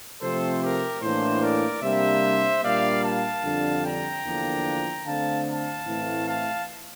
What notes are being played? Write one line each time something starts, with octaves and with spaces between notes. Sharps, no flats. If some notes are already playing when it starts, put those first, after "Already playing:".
C3 F3 A3 C4 A4 C5
G4 A#4
A2 E3 A#3 D4 A4 C5
A#4 D5
C3 G3 A#3 D4 C5 E5
A#2 G3 A#3 D4 D5 F5
F5 A5
F2 D3 G3 D4
G5 A#5
E2 D3 F3 A#3 D4
D3 A3 C4 F5 A5
F5 A5
A2 E3 A3 C4
F5 A5